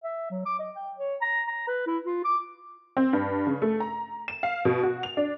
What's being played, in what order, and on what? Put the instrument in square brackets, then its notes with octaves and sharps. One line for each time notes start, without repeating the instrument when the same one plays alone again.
[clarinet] E5
F#3
D6
D#5
G5
C#5
A#5
A#5
B4
E4
F4
D6
[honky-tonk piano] C4
G2
C#3
A3
A#5
E7
F5
B2
F#4
F7
D4